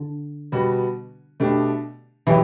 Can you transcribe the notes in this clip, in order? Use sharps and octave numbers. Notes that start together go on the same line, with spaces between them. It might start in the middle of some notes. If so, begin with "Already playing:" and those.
Already playing: D3
B2 G3 B3 F#4
B2 A3 D4 G4
B2 E3 F#3 B3 E4 G4